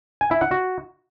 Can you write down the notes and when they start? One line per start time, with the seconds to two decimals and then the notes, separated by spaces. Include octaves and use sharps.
0.21 G#5
0.31 E4
0.41 F#5
0.51 F#4